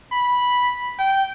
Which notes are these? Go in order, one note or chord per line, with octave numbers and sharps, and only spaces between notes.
B5
G5